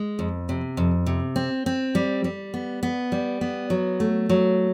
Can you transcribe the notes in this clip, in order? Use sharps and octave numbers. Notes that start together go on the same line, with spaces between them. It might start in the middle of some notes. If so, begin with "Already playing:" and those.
Already playing: G#3
F2
C3
F2
C3
C4
C4
G3
G3
B3
B3
G3
B3
F#3
A3
F#3